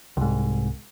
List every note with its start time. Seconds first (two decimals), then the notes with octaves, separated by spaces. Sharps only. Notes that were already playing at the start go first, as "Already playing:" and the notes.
0.17 C2 G#2